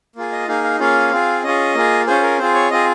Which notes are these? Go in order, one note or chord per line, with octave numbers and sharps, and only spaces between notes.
A#3 F4 G#4
D#5
A#3 D#4 G#4 F5
F5
A#3 C#4 F4 G#4 F5
C4 F4 G#4
C#4 F4 G#4 D#5
A#3 F4 G#4
C#4 F4 G#4 C5
A#4
C4 F4 G#4 C5
C#5
C4 F4 G#4 D#5